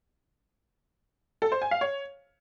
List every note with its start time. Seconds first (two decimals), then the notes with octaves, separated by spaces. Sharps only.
1.42 A4
1.52 C5
1.62 G#5
1.71 F5
1.81 C#5